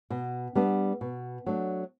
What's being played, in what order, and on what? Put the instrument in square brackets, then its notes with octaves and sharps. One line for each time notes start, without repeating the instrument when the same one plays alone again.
[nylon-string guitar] B2
G3 B3 D4
B2
F#3 A3 D4